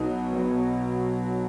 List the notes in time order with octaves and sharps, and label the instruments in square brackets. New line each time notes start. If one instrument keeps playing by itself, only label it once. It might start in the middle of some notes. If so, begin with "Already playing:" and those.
Already playing: [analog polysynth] B1 B2 F#3 [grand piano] D#4
[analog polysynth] B1